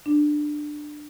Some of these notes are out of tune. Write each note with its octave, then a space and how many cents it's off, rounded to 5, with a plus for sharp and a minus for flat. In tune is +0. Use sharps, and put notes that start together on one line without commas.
D4 +15